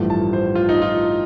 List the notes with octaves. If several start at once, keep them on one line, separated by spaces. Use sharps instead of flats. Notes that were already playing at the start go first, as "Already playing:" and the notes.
Already playing: A1 G2 F3 A3
A5
C5
F4
D#4
F4